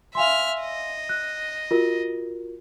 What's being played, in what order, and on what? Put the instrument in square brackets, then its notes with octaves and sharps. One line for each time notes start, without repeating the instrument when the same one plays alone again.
[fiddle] E5 F6 [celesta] F5 G#5 C6
[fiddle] D#5
[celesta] F#6
F4 F#4 A#4